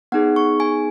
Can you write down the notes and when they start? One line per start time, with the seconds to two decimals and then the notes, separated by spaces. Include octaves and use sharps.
0.12 B3 D#4 G#4 F#5
0.36 C#6
0.60 G#5